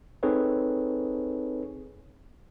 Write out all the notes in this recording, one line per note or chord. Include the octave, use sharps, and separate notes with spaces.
C4 D#4 G#4 A4 B4 C#5